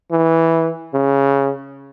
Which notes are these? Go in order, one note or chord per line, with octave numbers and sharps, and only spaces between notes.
E3
C#3